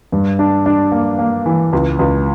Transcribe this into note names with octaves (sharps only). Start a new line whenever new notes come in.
G2
D4
D4
A#3
A#3
E3
C#2
C#2